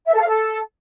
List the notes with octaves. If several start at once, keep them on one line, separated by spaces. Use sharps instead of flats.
E5
A4
F5
A4